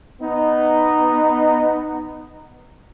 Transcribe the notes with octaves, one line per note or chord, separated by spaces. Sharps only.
B3 D#4